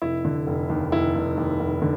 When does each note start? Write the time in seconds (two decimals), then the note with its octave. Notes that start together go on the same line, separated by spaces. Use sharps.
0.02 F1 E4
0.25 D3
0.47 F1
0.69 D#2
0.92 F1 E4
1.15 F1
1.37 D#2
1.60 F1
1.82 D3